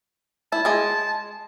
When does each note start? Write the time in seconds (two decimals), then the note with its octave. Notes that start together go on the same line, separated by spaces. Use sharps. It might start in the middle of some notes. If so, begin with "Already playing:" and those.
0.52 E4 A5
0.65 G#3 G#4